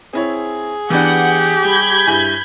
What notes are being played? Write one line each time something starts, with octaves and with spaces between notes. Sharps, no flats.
C4 E4 G#4 C#5
E3 B3 D4 G4 F#5
G3 B5 G6 G#6
G2 E4 G#5